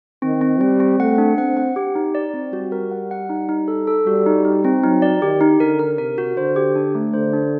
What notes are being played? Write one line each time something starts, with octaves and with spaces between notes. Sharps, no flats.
D#3 C4
C4
G3 C4
C4
A3 F#5
D4
C4 F#5
F#5
G4
D#4
D5
C4
G3 F#4
A#4
F#5
F#5
D#4
D#4
A4
A4
G3 F#4
D#4
D#4
C4
F#3 D#4
D5
D#3 G4
D#4
D3 A#4
A#4
C3 A#4
F#4
D3 C5
G4
D4
A3
D3 C5
D4